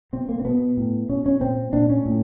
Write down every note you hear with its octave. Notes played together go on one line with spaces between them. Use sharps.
B2 C4
A#3
C4
B2 B3
A2
B2 C#4
C#4
A#2 C4
A#2 D4
C#4
A2